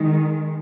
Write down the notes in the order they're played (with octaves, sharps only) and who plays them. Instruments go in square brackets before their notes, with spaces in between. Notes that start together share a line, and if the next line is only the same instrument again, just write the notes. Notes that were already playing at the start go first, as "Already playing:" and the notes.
Already playing: [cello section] D#3 G#3